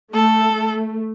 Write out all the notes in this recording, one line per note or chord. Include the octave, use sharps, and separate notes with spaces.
A3 A4
A3